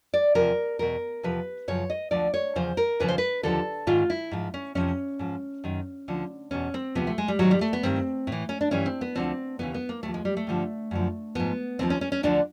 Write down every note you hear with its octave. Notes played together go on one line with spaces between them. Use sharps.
D5
E2 C3 F3 A#4
E2 B2 A#4
E2 C3 F3 B4
F#2 C#3 F3 C#5
D#5
D2 D3 F3 D5
C#5
E2 C#3 F3 C5
A#4
D#2 C#3 F3 B4
C5
B4
D#2 D3 F3 A4
G#2 D#3 F4
E4
G#2 F3
C#4
F2 C3 F3 C#4
G#2 F3
F#2 D#3
D2 D3 F3
E2 B2 C#4
C4
D2 C3 F3 B3
A3
G#3
G3
G#2 D#3 F#3
G3
A3
B3
G2 D#3 C4
A2 E3
C#4
D4
G2 E3 C#4
C4
B3
D2 D3 F3 C4
D#2 C#3 E3 B3
B3
A#3
D#2 D3 A3
F3
G#3
G3
A3
G2 D3 F3
F#2 D3 F3
G#2 F3 B3
D#2 D3 F3 C4
C#4
C#4
C#4
D2 D3 F3 D4